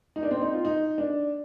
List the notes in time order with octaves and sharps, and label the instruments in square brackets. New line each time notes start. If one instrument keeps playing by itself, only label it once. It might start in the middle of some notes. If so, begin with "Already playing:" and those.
[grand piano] D#4
D4
C4
D#4
F4
D#4
D4